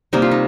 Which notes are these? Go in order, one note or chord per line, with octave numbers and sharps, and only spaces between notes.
C3 G3 A#3 D#4
F4
D#4